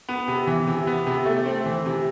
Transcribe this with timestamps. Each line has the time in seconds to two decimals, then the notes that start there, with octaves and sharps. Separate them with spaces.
0.09 B3
0.28 C3
0.47 E3
0.67 C3
0.87 B3
1.07 C3
1.26 A3
1.46 C4
1.66 E3
1.86 C3